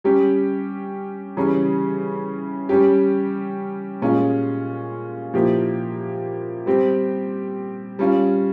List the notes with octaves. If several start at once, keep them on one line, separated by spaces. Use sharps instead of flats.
G3 C#4 G4
C#3 E3 G3 C#4
G3 C#4 G4
A#2 G#3 C#4 F4
A#2 F3 A#3 E4 G4
G3 C4 G4
G3 C#4 F4